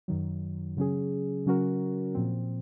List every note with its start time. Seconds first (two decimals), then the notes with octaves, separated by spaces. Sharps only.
0.08 F#2 D#3 F#3
0.77 C#3 F#3 C#4 G#4
1.46 C#3 F#3 C#4 F#4 A#4
2.15 A#2 F3 C4